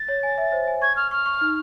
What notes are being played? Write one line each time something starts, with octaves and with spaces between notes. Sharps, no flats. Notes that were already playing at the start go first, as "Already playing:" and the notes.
Already playing: A6
C#5
G#5
E5
C5
G#5
C#6 G#6
C#6 F6
C#6 F6
C#6
D#4